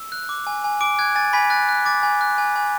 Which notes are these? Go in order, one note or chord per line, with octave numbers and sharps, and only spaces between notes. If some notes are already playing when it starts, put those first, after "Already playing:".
Already playing: E6
F#6
D6
G#5
G#5
D6 D7
F#6 G#6
G#5 A6
G#5 B5 B6
F#6 A6
F#6
D6 A6
G#5
F#6
G#5
G#5